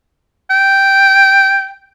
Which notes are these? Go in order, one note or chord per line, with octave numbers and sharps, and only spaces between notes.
G5